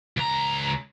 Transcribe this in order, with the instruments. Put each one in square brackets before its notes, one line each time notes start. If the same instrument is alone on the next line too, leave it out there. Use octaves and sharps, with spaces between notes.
[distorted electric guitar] C#2 A#5